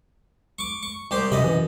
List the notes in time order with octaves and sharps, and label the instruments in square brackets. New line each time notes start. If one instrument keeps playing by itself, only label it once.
[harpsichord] C#6 D6
C#6
C2 G4 C5
[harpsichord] F#2 D#5 B5 [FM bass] C3
[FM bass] E3